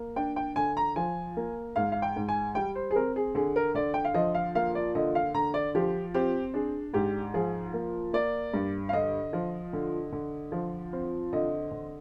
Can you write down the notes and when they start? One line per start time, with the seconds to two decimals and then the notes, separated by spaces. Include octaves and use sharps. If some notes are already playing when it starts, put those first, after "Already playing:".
Already playing: A#3
0.16 D4 G5
0.36 G5
0.56 D3 G#5
0.77 A#5
0.96 F3 G#5
1.37 A#3
1.76 G#2 F5
1.92 F5
2.02 G5
2.16 G#2
2.29 G#5
2.55 G3 G5
2.75 C5
2.91 G#4
2.96 C4 A#4
3.16 G#4
3.35 D3 G#4
3.56 A#4
3.75 D3 D5
3.94 G5
4.05 F5
4.14 F3 D#5
4.34 F5
4.55 A#3 F5
4.75 D5
4.95 D3 D#5
5.15 F5
5.35 D3 A#5
5.54 D5
5.75 F3 G4
6.14 C4 G4
6.54 D4 G#4
6.93 G#2 G4
7.34 F3 G#4
7.74 A#3
8.13 A#3 D5
8.54 G2
8.89 F5
8.93 D3 D#5
9.33 F3
9.73 D3
10.12 D3
10.52 F3
10.93 C4
11.33 D3 D#5
11.71 D3